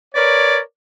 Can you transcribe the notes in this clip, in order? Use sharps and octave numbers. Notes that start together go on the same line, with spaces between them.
A#4 B4 C#5 D5